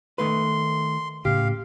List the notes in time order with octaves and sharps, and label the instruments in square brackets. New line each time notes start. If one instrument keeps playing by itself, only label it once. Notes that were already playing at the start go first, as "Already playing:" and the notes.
[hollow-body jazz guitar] D#3 A3 B4 [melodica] C6
[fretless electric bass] A2 C#3 [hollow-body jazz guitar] G4 [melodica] F5